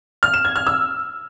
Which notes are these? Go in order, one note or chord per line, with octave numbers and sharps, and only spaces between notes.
F6
E7
G#6
F6
E6